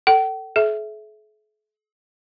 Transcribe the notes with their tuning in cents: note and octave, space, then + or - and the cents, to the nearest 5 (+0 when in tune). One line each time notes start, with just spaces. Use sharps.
A4 +20 G5 -45
G#4 +45 E5 +0